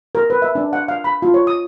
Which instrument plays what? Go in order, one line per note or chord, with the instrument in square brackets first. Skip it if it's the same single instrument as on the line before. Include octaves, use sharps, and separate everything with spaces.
[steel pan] A#4
B4
E5
D4
F#5
F5
B5
F4
C#5
D#6